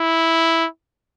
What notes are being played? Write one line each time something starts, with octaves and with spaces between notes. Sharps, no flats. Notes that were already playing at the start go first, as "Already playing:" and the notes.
Already playing: E4